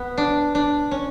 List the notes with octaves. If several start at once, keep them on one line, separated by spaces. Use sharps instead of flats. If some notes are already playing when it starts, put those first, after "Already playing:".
Already playing: B3
D4
D4
C#4